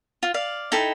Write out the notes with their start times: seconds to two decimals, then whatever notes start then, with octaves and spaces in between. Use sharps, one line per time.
0.23 F4
0.34 D5 F5
0.72 D#4 E4 A4 G5